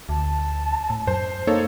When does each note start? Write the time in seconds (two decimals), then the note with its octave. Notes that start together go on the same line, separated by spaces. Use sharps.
0.09 D2 A5
0.90 A2
1.07 F#2 C5
1.47 A#3 D#4 A4 C#5 F5